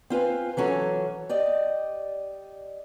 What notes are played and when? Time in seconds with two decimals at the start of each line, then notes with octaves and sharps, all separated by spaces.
0.10 C4 F4 B4 G#5
0.57 E3 F#3 C#4 A4
1.29 G4 D5 D#5